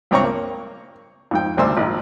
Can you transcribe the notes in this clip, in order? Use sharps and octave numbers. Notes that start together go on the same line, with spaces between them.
C#2 G2 C4 C#5 A#5 C#6
A#3
F2 G#2 G5
G#1 D2 C3 G3 C5 E6
G#1 F2 A#2 D#5